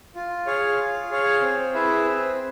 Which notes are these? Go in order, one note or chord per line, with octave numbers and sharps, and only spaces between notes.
F4
G#4 C#5 F5
F4
G#4 C#5 F5
C4
E4 G#4 B4 E5
C4